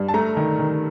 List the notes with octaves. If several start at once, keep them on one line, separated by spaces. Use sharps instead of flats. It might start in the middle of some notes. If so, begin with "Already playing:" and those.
Already playing: G2
A5
A3 A#5
D#3
D#3